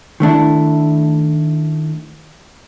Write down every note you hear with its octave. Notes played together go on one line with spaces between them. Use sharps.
D#3 A3 D4 E4